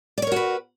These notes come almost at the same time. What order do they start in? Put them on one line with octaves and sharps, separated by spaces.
D5 C#5 A#4 F#4 B4